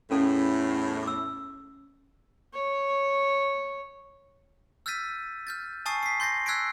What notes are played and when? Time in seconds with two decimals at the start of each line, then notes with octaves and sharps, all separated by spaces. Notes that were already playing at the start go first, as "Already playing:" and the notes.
0.11 E2 A2 C#4 A4 F5
1.03 D6 E6
2.53 C#5
4.86 E6 F6 G6 A6 B6 D#7
5.47 F6 G6 A6
5.86 G#5 A5 C#6 D#6 A6 C7
6.03 B6 C7
6.20 C6 G6 A6 A#6 C7
6.46 E6 F#6 G#6 B6 C7 D7